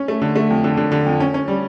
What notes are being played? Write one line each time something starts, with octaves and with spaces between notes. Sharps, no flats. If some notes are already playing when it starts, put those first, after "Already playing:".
Already playing: C#4
A3
D3
A3
F2
D3
D3
D3
F2
C#4
C#4
G3